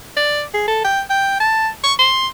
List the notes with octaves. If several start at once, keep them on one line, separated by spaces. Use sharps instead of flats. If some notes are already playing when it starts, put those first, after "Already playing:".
D5
G#4
A4
G5
G5
A5
C#6
C6